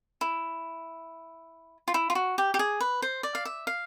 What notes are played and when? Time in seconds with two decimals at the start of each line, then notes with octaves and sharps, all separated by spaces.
0.21 E4
1.88 F4
1.94 E4
2.10 F4
2.15 F#4
2.38 G4
2.54 G4
2.59 G#4
2.81 B4
3.02 C5
3.23 D5
3.35 F5
3.45 E5
3.67 F5